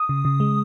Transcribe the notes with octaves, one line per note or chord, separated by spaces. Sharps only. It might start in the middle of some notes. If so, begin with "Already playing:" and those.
Already playing: D#6
C#3
C#3
G#3